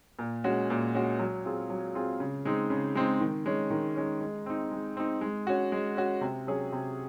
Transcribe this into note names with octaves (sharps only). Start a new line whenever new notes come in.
A#2
G#3 C#4 F#4
A#2
G#3 C#4 F#4
F#3
C4 F4 G#4
F#3
C4 F4 G#4
C#3
G#3 C4 D#4
C#3
G#3 C4 D#4
D#3
G#3 C#4
D#3
G#3 C#4
G#3
C4 D#4
G#3
C4 D#4
G#3
C#4 F#4
G#3
C#4 F#4
C3
F#3 C#4 G#4
C3